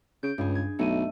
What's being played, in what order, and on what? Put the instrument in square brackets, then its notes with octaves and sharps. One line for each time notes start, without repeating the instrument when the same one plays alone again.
[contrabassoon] C#3 [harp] G6 D7
[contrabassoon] C#2 [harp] G2 G#4
[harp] G#6
[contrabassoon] B1 [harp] A3 D#5 D#7